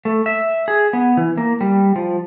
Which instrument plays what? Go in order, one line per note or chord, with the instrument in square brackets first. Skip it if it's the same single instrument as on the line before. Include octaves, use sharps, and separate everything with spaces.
[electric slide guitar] A3
E5
G#4
B3
E3
A#3
G3
F3